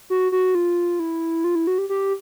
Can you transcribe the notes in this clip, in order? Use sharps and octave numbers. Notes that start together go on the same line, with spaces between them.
F#4
F#4
F4
E4
F4
E4
F#4
G4
G4